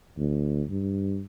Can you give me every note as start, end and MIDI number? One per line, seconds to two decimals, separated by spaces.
0.17 0.63 38
0.69 1.23 43